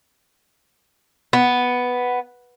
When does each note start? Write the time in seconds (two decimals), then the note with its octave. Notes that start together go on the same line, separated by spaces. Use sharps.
1.33 B3